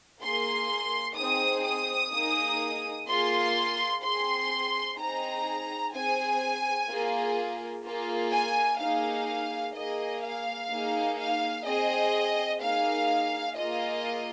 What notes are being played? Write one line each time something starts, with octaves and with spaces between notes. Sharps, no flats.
A#3 G#4 C6
C4 D#4 G#4 D#6
D#6
A#3 D#4 G#4
A#3 F4 G#4 C6
C4 G#4 C6
C4 D#4 G#4 A#5
C4 G#4 G#5
A#3 F4 G#4
A#3 F4 G#4
G#5
A#3 D#4 G#4 F5
A#3 G#4 D#5
F5
A#3 D#4 G#4
F5
C4 G#4 D#5
A#3 D#4 G#4 F5
A#3 F4 G#4 D#5